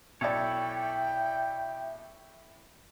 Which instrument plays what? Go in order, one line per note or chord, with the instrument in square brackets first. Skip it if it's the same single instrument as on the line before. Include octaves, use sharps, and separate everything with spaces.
[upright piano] B1 D5 [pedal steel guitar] E4 A4 C#5 [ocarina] E5 [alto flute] G5